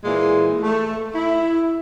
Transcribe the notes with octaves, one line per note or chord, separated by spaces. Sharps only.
A#2 E3 G#3
A3
E4